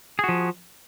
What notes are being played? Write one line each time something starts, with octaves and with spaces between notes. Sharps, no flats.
F3 F#4 G#4